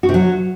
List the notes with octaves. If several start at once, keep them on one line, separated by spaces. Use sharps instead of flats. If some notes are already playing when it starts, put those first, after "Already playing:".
F#4
C3
F#3